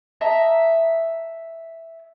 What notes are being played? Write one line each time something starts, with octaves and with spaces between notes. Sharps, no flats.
D#5 E5 A5 A#5